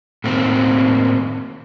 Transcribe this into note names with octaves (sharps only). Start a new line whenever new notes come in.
A2 D#3 A#3 C4